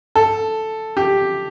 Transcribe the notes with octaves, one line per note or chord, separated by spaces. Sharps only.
A4
G4